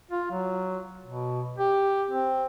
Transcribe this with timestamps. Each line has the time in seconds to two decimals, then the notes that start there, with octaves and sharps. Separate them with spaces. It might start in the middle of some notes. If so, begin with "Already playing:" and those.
0.11 F4
0.31 F#3
1.05 B2
1.58 G4
2.10 C4